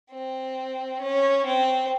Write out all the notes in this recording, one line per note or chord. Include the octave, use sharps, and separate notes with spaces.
C4
C#4
C4